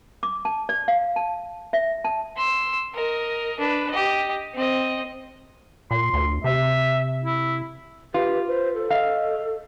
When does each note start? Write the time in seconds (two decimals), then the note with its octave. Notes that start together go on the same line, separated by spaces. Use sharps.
0.23 D6
0.45 A5
0.69 D5
0.88 F5
1.16 A5
1.73 E5
2.04 A5
2.36 C6 E6
2.94 A#4 D#5
3.59 D4 B4
3.91 G4 D#5
4.54 C4 D#5
5.91 A#2 C6
6.14 D2
6.44 C3 E5
7.24 E4
8.14 F4 G4 B4
8.48 B4 C5
8.75 A4
8.90 D#5 F5